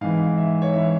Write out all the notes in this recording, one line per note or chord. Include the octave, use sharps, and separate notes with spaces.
G#2 E3 F5
E5
C#5
E3 E5